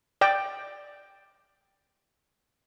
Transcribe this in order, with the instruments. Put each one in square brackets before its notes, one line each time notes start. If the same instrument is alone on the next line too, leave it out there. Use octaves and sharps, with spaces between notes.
[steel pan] D5 G5